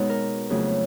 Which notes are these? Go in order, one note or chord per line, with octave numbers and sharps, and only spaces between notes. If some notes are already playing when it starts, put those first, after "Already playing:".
Already playing: B2 G#3 B3 D#4 C#5
A#4
F2 C#3 F#3 A3 G#4